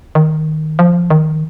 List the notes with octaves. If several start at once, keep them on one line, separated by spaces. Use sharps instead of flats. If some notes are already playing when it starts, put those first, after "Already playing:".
D#3
F3
D#3